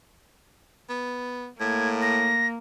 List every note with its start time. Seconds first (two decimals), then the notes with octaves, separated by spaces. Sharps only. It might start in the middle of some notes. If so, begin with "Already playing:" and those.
0.90 B3
1.60 A2 A#3 G#6
2.02 A#6